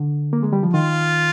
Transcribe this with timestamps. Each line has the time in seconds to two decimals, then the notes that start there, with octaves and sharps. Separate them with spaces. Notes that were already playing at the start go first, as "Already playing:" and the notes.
Already playing: D3
0.33 A#3
0.43 G#3
0.53 G3
0.63 F3
0.73 D#3 F4